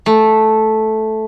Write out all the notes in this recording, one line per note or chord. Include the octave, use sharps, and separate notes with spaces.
A3